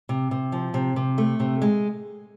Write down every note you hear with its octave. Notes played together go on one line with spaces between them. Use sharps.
C3
C3
F3
C3
C3
A3
C3
G#3